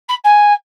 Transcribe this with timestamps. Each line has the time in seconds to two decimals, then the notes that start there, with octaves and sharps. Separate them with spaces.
0.08 B5
0.24 G#5